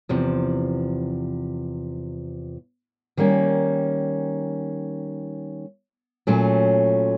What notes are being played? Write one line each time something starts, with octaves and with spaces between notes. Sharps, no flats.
E2 C3 F3
D#3 G3 A#3 C#4
A#2 F#3 A3 C#4 F4